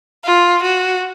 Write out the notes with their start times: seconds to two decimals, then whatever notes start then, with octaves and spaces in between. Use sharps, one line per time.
0.24 F4
0.63 F#4